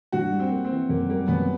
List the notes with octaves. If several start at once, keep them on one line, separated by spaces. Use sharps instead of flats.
G2 F#4
G3
C4
A#3
C4
E3
F#2 A#3
G3 A#3
F#2 B3